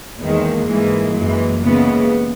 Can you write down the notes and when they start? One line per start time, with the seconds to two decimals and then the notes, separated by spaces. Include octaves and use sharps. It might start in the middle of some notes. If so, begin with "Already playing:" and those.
0.19 E2 D#3 G#3 A#3
0.66 G#2 E3 G#3
1.13 F#2 E3 G#3
1.61 D#2 C#3 E3 G#3 B3